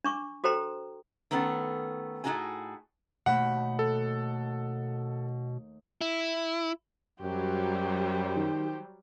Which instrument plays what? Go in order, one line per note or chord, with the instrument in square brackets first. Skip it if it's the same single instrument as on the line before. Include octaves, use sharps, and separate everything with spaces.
[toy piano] D4 C#6 D6
F#4 A4 C5 G5 A#5 C6
[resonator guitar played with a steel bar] D#3 A3 B3 C#4
A2 A3 D#4 F#4 G#4 G#5
[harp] D#2 A3 B5 [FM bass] B2 [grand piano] F#5
[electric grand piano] A4
[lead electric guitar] E4
[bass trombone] F#2 [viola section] F#3 G3 [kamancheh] G4 C5
[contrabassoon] D#3